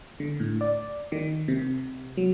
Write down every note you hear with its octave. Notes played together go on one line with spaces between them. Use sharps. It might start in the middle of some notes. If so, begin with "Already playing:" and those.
D3
A2
D5
D#3
C3
F#3